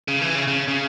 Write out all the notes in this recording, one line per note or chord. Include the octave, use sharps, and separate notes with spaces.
C#3
E3
C#3
C#3
C#3